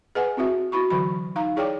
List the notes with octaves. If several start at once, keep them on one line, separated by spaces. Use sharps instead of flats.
G#4 B4 D#5 F#5 G#5
C4 E4 F#4 E5
E4 F#4 B5 C#6
D3 E3 F#3 D#5 B5
D#4 F5 A#5
E4 G#4 C#5 D5 G5 D6